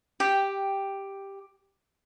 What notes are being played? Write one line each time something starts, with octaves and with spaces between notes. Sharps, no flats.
G4 G5